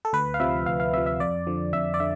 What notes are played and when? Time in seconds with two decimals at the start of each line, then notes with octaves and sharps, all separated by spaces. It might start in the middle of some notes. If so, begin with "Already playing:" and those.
0.05 A4
0.13 D2 B4
0.34 F5
0.40 C3 F3 E5
0.66 D2 F5
0.80 F5
0.93 C3 F3 E5
1.06 E5
1.20 F2 D5
1.47 D3 F3
1.73 F2 E5
1.94 D5
2.00 D3 E5